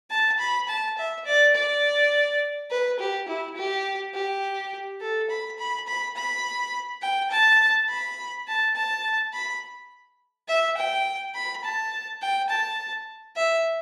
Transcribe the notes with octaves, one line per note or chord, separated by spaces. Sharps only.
A5
B5
A5
E5
D5
D5
B4
G4
E4
G4
G4
A4
B5
B5
B5
B5
G5
A5
B5
A5
A5
B5
E5
G5
B5
A5
G5
A5
E5